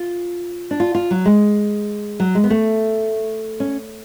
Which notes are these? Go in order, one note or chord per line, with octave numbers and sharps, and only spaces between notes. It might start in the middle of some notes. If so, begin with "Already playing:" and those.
Already playing: F4
D4
F4
F4
F#3
G#3
F#3
G#3
B3
A3
C#4